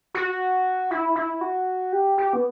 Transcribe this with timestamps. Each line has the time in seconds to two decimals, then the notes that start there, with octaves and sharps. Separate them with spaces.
0.15 F#4
0.91 E4
1.15 E4
1.41 F#4
1.93 G4
2.18 G4
2.33 B3